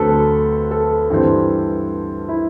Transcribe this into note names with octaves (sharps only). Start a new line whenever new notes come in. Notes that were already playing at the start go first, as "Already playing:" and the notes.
Already playing: D2 D3 F#3 C4 A4 B4
A4
G2 E3 G3 C4
E4